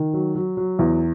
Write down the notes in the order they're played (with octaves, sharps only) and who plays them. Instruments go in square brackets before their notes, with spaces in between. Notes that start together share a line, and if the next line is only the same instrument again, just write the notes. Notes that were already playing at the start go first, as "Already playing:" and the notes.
Already playing: [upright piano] D#3
F#3
F#3
F#3
E2